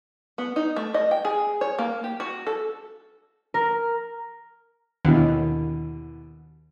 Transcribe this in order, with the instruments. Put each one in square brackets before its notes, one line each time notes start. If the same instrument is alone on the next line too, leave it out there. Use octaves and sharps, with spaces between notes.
[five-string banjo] B3
D#4
A3
D#5
G5
G#4
C#5
A#3
G4
F#4
A4
[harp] A#4
[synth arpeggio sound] D#2 [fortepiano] B2 D3 E3